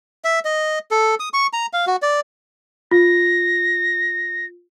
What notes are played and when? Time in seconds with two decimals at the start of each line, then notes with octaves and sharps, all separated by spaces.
0.24 E5
0.45 D#5
0.91 A4
1.20 D#6
1.33 C#6
1.53 A#5
1.73 F5
1.87 F#4
2.02 D5
2.91 F4 A#6